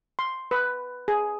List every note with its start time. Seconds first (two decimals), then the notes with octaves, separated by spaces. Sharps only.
0.19 C6
0.51 B4
1.08 G#4